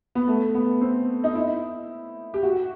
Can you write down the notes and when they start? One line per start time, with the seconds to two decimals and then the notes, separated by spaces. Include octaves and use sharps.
0.15 B3
0.28 A3
0.55 B3
0.81 C4
1.24 D#4
1.35 E4
2.34 G4
2.43 F#4